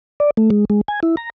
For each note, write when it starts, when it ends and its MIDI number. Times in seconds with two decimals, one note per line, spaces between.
0.20 0.30 74
0.37 0.50 57
0.50 0.65 56
0.70 0.81 56
0.88 1.00 80
1.03 1.16 64
1.17 1.30 82